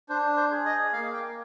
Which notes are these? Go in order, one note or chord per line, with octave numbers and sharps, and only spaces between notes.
D4 C5
C5
G#4
D#5
A#3 F5
G5